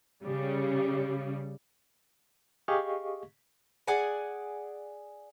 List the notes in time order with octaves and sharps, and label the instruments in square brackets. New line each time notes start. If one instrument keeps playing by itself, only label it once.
[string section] C#3 G3
[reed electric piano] G4 G#4 D#5 F5 C#6
[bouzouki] G#4 D5 F#5 G#5